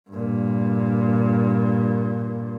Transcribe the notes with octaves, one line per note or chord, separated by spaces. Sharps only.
G2 A#2